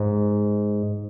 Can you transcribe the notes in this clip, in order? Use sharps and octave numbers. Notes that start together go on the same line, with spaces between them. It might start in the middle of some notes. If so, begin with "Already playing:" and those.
Already playing: G#2